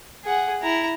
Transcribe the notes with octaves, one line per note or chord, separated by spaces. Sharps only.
G#4 F#5
E4 A#5